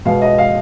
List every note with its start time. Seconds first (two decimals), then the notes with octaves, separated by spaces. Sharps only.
0.05 B2 G#3 B3 F5
0.22 D#5
0.38 F5